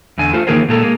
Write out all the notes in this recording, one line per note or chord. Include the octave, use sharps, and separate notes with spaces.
E2 D3 G#5
A3 F4 C5
D#3 E3 A#3 G#4 A#4 C5
A#2 G#3 A4 A#5
G#3 A#3